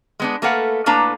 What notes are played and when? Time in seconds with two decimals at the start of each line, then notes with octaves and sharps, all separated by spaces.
0.20 G#3 B3 D4
0.42 A3 A#3 A4 B4 F5 F#5
0.86 A2 A#3 D4 B4 A5 A#5